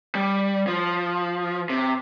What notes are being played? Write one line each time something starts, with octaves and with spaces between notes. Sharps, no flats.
G3
F3
C3